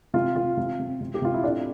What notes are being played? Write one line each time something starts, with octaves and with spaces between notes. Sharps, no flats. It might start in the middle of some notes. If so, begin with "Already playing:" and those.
C3 F4
C3 F4
C3
C3
C3
G4
C3 F4
E4
A2 D4